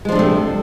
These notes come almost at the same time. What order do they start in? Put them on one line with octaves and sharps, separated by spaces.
G#3 F3 D4 C3 A3